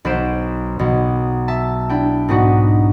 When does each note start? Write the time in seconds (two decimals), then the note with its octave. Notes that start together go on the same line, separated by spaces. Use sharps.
0.05 B1 B4 C5 D7 E7
0.79 B1 B2
1.48 E5 A5
1.89 D4 E4 G5
2.28 G#2 B3 D4 D#4 F#4